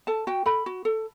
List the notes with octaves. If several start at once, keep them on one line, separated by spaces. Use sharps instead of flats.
A4 A5
F#4 G5
A4 B5
F#4
A4